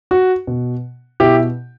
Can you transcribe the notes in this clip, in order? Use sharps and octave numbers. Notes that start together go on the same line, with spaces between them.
F#4
B2
B2 E4 G4